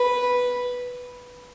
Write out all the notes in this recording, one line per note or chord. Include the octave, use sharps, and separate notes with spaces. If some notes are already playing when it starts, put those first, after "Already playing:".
Already playing: B4